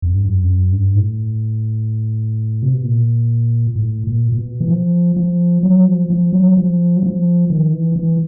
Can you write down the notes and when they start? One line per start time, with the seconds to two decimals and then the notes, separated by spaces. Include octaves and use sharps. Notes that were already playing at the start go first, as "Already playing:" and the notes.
0.02 F2
0.14 G2
0.25 F#2
0.43 F2
0.48 F#2
0.72 G2
0.95 A2
2.62 C3
2.73 B2
2.83 A#2
3.76 A2
4.07 A#2
4.32 A#2
4.38 B2
4.60 E3
4.70 F3
5.16 F3
5.63 F#3
5.86 F3
6.10 F3
6.33 F#3
6.57 F3
6.96 F#3
7.03 F3
7.50 D#3
7.73 E3
7.96 E3